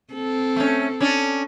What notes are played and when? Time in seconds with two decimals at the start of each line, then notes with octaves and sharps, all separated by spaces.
0.13 C4 A4
0.56 A3 C#4
1.00 C#4 D4 A4